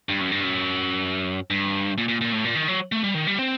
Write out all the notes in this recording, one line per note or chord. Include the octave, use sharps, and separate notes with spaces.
G2
F#2
G2
F#2
G2
A#2
A#2
A#2
A2
A#2
D#3
F#3
A3
G3
D#3
G3
C4